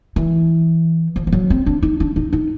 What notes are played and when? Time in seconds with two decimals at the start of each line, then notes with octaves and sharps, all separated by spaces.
0.16 E3
1.16 F3
1.27 F3
1.32 F#3
1.50 C4
1.66 D4
1.83 D#4
2.00 D4
2.16 D#4
2.33 D#4